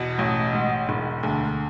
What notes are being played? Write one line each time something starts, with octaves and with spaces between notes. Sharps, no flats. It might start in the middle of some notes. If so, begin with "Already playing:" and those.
Already playing: E2 B2 F#5
A1
G#2
E1
D2